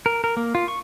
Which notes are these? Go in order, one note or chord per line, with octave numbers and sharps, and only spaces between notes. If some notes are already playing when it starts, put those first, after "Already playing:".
A#4
A#4
A#3
F4
C#6